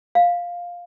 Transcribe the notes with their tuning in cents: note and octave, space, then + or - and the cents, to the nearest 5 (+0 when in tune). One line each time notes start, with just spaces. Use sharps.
F5 +5